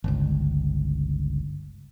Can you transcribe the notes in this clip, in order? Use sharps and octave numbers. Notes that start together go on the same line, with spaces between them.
G1 C#2